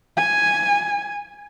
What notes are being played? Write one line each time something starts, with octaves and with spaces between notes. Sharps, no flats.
G#5